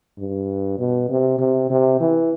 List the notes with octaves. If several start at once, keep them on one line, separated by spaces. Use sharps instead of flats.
G2
B2
C3
C3
C3
E3